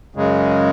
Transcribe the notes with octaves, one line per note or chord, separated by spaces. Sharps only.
F#2 C#3 G#3